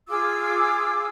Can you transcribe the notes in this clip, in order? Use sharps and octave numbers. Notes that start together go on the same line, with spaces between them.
F4 G#4 D6 E6